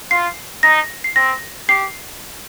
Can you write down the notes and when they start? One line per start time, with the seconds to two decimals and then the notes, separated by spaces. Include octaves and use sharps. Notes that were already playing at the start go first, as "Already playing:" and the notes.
0.11 F4 C7
0.63 D#4 A#6
1.04 C7
1.16 C4 A#6
1.69 G4 C7